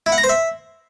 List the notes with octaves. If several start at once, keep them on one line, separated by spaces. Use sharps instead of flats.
E4
F#5
A#5
C5
E5